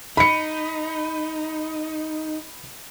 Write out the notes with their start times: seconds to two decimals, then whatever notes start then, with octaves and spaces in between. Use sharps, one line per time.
0.17 D#4 B5 C#7